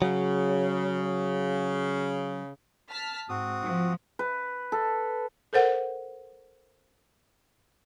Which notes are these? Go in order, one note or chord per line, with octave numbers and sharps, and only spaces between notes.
C#3 F#3
A5 F6 B6
G#2 C4 F#4 D#6
F3
B4
A4
A4 A#4 C5 F#5